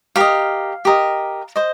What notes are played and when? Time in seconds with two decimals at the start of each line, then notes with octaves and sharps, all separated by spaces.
0.16 G4 A#4 D#5 F5
0.85 G4 A#4 D#5
1.56 C5 D#5